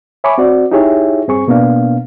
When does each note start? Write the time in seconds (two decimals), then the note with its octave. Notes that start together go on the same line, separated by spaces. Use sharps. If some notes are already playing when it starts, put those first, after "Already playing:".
0.24 C#5 E5 G#5 B5 C#6 D6
0.38 C4 F#4 D5
0.71 D#4 E4 G4 G#4 C#5 E5
1.28 G2 C4 G#4 C#6
1.47 B2 A#3 B3 D4 F5